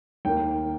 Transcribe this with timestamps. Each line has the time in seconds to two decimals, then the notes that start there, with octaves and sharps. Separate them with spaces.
0.25 D#2 D#3 A#3 G5